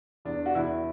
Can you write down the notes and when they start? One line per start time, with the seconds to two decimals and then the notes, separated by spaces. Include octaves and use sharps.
0.25 E2 D4
0.46 F#4
0.55 E2 E4